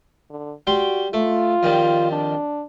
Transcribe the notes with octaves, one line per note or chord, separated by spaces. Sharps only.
D3
G3 F#4 G5 C6
A3 F4
F2 D#3 G3
D4